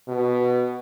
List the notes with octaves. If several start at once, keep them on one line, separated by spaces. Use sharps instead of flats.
B2